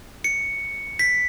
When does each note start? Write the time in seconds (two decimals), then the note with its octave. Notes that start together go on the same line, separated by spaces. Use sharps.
0.24 C#7
0.99 B6